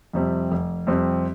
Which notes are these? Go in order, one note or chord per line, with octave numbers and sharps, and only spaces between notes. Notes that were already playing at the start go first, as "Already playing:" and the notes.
F2 C3 G3 C4
F1
F2 C3 G3 C4